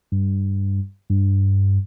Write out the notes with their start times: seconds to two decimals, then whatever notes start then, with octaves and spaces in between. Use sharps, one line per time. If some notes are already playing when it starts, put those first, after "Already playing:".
0.12 G2
1.10 G2